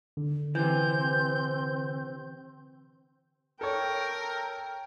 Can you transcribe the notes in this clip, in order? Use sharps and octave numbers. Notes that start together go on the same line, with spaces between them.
D3
C3 E3 C4 G6
A4 A#4 C#5 G5